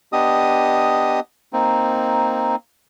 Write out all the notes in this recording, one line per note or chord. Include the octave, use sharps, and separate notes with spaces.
B3 D4 G4 D#5 D#6
A#3 C4 D#4